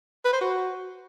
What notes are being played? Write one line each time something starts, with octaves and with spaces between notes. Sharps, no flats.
B4
C5
F#4